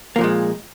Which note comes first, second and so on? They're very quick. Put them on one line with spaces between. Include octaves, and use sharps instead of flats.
A#3 F3 A#2 G#3